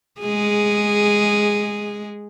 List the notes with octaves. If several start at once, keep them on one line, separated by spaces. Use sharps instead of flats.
G#3 G#4